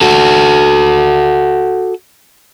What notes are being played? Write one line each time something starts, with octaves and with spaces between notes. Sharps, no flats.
F#4 A4